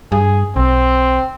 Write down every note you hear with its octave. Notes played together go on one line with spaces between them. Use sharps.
G2 G#4
B1 C4